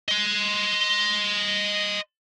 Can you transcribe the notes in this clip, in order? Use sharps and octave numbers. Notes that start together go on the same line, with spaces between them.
D#5 C6